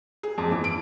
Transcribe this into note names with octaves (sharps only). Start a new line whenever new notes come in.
G#4
F2
E3
D7